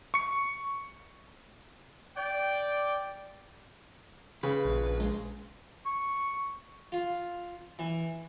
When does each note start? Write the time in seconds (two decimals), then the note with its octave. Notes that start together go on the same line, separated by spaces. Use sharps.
0.14 C#6 C#7
2.16 D5 G5
4.43 C#3 B4
4.65 A#1
5.00 G#3
5.85 C#6
6.92 F4
7.79 E3